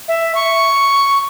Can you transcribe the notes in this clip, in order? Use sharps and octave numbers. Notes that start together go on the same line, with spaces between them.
E5
C#6